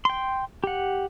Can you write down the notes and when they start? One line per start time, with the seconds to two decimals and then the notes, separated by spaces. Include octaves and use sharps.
0.05 G5 C6
0.64 G4 F#5